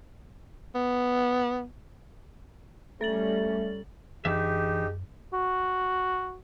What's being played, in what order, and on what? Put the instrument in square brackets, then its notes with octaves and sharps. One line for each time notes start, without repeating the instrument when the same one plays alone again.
[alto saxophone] B3
[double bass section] G3 C#4 [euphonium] A3 [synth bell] A4 A6 F#7
[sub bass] F#2 [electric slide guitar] D3 E3 E5 [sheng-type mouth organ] D#4 G4 [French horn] G#4
[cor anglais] F#4